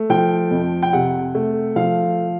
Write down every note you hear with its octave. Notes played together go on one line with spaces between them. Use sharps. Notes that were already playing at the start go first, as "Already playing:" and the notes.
Already playing: A3
F3 G5
F2
G5
C3 F#5
A3
F3 F5